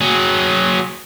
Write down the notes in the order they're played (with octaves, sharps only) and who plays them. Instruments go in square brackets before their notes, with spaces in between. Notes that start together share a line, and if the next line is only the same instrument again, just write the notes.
[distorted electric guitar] F#3 G#4